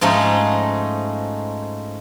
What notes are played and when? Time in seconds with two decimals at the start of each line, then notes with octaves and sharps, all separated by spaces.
0.01 G#2 F3 G#3 A3 C#4 D#4